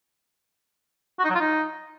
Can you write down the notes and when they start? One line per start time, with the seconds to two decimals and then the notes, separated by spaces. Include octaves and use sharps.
1.19 F#4
1.25 D#4
1.30 F#3
1.35 F4
1.40 D#4